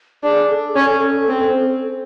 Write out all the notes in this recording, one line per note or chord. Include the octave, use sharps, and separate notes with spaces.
D4 G#4
A4
C#4
C4